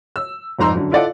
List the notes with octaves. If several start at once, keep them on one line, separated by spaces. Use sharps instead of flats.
E6
F1 F2 G#2 A#5 C6 E6
F#2 D3
E4 F4 A4 D5 D#5 F#5